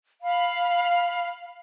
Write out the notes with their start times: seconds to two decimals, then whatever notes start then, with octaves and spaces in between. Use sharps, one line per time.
0.22 F5 B5